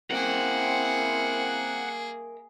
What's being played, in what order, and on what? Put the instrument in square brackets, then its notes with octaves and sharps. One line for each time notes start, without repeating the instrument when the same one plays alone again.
[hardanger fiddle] A#3 G#4 [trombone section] C4 E4 [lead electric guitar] A#4 E5 [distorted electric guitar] F#5